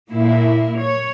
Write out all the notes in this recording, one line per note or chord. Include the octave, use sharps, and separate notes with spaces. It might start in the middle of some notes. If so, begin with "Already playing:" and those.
A#2 A#3 E4
C#5